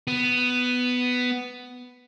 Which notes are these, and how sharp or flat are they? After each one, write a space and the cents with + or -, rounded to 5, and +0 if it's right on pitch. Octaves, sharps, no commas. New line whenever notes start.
B3 +10